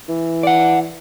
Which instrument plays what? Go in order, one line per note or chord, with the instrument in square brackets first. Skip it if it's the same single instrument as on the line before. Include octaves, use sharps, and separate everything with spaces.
[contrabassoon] E3
[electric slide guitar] D5 F#5